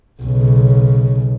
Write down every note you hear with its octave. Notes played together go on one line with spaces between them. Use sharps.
B1 C#3